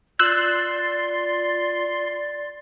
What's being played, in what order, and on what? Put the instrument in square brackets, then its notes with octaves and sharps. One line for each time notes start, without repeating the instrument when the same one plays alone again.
[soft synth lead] F4 [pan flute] D5 [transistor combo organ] C6 [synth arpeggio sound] E6 F#6